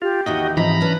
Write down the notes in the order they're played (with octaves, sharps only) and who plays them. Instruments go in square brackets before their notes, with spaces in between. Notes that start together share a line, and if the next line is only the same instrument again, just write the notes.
[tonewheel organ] F4 [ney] G4
[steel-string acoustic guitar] D#2 D#3 E3 [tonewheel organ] F#4 D#5
[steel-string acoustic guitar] G#2 C3 F3 [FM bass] E3 [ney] D#5 [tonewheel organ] A#5 B5
[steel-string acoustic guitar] C#4 D4 [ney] B4